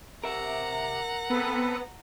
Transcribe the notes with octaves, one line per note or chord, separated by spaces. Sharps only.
C3 A#4 E5 F#5 A#5
B3 C4 A4 B4